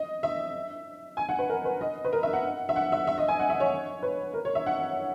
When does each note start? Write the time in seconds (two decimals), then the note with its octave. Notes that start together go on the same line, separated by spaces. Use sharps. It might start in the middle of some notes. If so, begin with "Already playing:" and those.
Already playing: D#5
0.23 E5
1.17 G#5
1.29 F#5
1.39 B4
1.49 A#4
1.65 B4
1.81 D#5
2.05 B4
2.13 A#4
2.23 E5
2.33 F#5
2.69 E5
2.76 F#5
2.92 E5
3.07 E5
3.18 D#5
3.28 G#5
3.39 F#5
3.50 E5
3.60 C#5
4.03 B4
4.34 A#4
4.45 C#5
4.55 E5
4.66 F#5